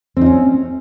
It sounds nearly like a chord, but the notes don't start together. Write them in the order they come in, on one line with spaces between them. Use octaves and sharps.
C4 D#4 C#4